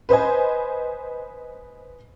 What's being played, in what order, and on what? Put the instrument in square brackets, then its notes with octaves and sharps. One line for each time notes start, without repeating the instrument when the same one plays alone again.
[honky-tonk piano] B4 C5 D#5 G#5